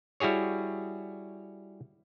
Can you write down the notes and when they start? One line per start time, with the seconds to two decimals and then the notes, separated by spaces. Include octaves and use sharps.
0.20 G3 E4 F#4 G#4 C#5